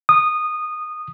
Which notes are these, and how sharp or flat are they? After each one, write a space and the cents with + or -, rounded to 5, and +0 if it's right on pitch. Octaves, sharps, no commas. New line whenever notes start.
D#6 -15